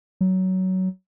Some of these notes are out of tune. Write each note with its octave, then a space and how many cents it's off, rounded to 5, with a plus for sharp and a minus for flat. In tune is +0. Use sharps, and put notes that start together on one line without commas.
F#3 +15